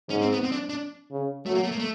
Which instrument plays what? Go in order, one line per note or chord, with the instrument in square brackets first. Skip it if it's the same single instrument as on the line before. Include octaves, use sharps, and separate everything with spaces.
[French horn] G#2 [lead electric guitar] C#4
[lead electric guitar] C4
B3
C4
D4
D4
[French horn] C#3
[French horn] F#3 [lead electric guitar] A3
[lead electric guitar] A#3
A3
A#3
A3